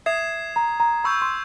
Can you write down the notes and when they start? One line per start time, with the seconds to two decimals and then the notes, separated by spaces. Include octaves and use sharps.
0.06 E5 D#6 G#6 C7 E7
0.56 A#5
0.80 A#5
1.04 B5 C#6 E6 G6
1.21 C6